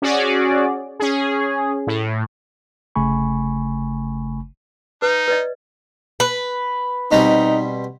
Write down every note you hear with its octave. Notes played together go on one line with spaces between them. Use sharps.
C#4 F#4 G#4 D5
C#4 G#4
A2
G1 C#3 A3 G#5 B5 C#6
D#4 B4
B4 D5 D#5
B4
B2 G3 C4 D#4